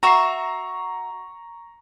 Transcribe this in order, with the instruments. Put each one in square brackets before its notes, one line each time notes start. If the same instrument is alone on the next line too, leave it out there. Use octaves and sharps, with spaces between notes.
[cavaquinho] F#4 E5 [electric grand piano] A#5 C#6 C7